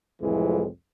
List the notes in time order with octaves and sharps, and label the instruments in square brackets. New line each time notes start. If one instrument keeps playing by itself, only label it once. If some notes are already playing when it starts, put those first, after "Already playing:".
[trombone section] C2 F2 A2 E3 F3 G#3